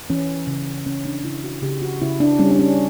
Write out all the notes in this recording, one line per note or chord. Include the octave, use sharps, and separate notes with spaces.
E3 C#4
C#3
C#3 C#4
D4
C#3 E4
F#4
C#3 G4
F#4
C#3 E4
D4
G3 C#4
D4
C#4